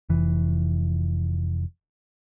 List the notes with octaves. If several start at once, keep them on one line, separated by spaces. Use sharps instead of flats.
F1 E3